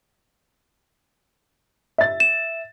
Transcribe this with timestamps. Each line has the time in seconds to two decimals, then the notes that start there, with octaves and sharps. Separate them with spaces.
1.98 E5 A6
2.20 E7